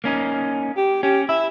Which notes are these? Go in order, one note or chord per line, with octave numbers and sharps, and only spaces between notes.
A#3 C#4 D#4
G4
C#4 G4
E4 E5